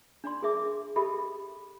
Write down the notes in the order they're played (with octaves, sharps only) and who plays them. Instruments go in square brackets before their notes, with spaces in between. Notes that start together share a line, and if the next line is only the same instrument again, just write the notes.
[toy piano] D4 D5 C6
G#4 A#4 E5 D6
G4 A4 A#4 D#5 E5 B5